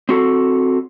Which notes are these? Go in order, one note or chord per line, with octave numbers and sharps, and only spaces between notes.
C4 F#4 A4